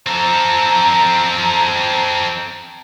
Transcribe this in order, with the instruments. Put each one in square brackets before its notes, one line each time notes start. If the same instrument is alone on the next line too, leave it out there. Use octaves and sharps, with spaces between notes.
[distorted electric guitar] C4 A4 [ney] A#5